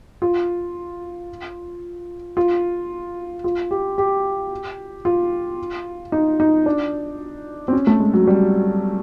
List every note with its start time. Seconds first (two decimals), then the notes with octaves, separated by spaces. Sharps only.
0.22 F4
2.37 F4
3.44 F4
3.71 G4
3.98 G4
5.05 F4
6.12 D#4
6.40 D#4
6.66 D4
7.68 C4
7.73 C#4
7.87 A3
8.00 G#3
8.14 F#3
8.27 G3